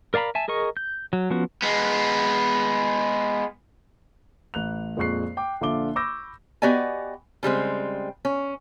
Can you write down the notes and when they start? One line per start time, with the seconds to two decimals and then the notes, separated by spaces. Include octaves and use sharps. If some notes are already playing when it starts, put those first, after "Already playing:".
0.14 A#4 D5 F5 A#5 B5
0.35 E5 G#5 A5
0.48 G#4 A#4 D#5 C#6
0.77 G6
1.13 F#3
1.30 F3 B3 C#4 F#4
1.62 G#3 B3
4.54 A1 F#6 F7
4.97 F2 A#2 G#3 C#6 F#6 C7
5.37 G5 D6
5.61 A#1 D3 F4 E5 D6 G7
5.96 B5 C#6 D6 E6 G6 A#6
6.62 B3 F#4 G4 D5 D#5 G#5
7.43 C#3 G3 G#3 C4
8.25 C#4